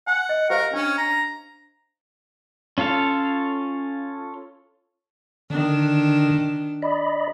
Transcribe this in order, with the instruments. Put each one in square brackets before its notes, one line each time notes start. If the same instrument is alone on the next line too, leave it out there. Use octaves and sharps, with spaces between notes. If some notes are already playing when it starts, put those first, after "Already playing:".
[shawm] F#5 [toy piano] G#5
[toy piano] D#5
[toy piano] G4 C5 F5 [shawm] A#4
[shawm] C#4 [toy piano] D4
[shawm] A#5
[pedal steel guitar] C#4 F4 A4 F5
[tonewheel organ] D3 [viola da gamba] D#3 D4
[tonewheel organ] D5 D#5 B5